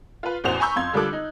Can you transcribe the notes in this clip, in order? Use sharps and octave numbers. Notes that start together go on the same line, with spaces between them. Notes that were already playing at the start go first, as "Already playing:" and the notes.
F4 B4
A1 E2 F#4 C5 F7
G#5 A#5 B5 C#6 E6 G6
F2 F5 C6 G#6
D3 G3 F4 A4 D6 F#6
D#4